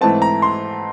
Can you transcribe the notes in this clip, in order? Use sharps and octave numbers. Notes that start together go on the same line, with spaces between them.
G#2 E3 A3 C4 A5
A#5
C6